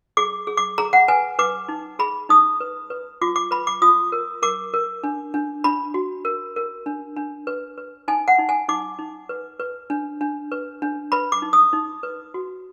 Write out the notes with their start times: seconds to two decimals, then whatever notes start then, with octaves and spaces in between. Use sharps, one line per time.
0.17 G#4 D6
0.47 G#4
0.57 D6
0.78 G#4 A#5
0.93 F#5
1.08 B4 G#5
1.39 B4 D6
1.68 D#4
1.99 G#4 B5
2.29 D#4 D#6
2.60 B4
2.90 B4
3.22 F4 D6
3.36 D6
3.51 B4 B5
3.67 D6
3.82 F4 D#6
4.12 A#4
4.42 A#4 D6
4.74 A#4
5.04 D4
5.34 D4
5.64 D4 B5
5.94 F#4
6.25 A#4
6.56 A#4
6.86 D4
7.16 D4
7.47 B4
7.78 B4
8.08 D#4 G#5
8.28 F#5
8.39 D#4
8.49 G#5
8.68 D#4 D6
8.99 D#4
9.29 B4
9.60 B4
9.90 D4
10.21 D4
10.52 B4
10.82 D4
11.12 B4 B5
11.32 D6
11.42 D#4
11.53 D#6
11.73 D#4
12.03 B4
12.34 F#4